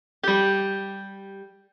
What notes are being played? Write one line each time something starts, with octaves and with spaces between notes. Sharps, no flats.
G3 G4